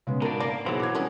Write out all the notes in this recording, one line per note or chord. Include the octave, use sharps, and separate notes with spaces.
C#3 G#3 B3
G#2 B2 D4 A#4
A#3 D5
B1 E3 F#3 G#4 C5
D6 G#6
G3 B3 C#4 D4